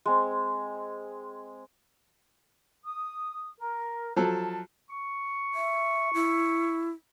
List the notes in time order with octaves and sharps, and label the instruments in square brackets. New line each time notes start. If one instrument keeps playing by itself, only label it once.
[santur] G#3 C4
[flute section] D#6
A#4
[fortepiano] F3 F#3 A4 [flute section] A5
[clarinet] C#6
[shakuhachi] E5
E4